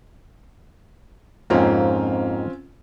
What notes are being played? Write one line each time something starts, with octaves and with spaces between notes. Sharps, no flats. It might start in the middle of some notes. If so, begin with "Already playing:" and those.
F2 G#2 A#3 C4 C#4 F4